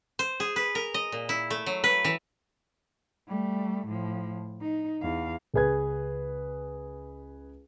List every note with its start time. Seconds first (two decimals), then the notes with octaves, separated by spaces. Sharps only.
0.19 C5
0.40 G#4
0.56 B4
0.75 A#4
0.94 D#5
1.12 A#2
1.29 E4
1.50 A3
1.66 F#3
1.84 B4
2.05 E3
3.28 G3 A3
3.88 A2 F3
4.61 D#4
5.02 E2 F5
5.54 C#2 C#3 G#4 B4 G#6